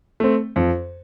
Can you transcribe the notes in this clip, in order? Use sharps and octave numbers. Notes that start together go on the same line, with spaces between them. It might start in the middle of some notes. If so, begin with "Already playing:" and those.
A3 C4
F2